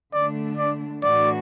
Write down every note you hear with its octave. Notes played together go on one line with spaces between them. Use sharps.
D3 A3 D4 D5
D5
A2 E3 A3 D4 F#4 D5